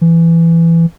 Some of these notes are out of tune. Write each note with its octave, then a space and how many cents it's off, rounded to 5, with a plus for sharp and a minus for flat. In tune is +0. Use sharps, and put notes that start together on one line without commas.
E3 +15